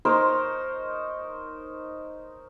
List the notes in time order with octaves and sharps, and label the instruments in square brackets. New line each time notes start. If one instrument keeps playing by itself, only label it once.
[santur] D#4 A#4 C5 C#5